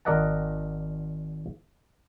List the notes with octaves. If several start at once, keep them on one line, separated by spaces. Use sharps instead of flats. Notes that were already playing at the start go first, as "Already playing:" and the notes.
G#1 A#4 D5 D#5 F#5 A5